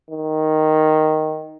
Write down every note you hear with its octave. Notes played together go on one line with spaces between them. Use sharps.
D#3